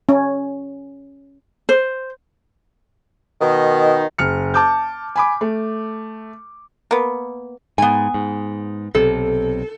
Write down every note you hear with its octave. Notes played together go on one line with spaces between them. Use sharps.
C#4
C5
B2 D#3
F#1 F6 C#7
A5 D6 G6
G#5 B5 D6
A3
A#3 B3
G#2 B3 G#5
G#2
B1 C3 A4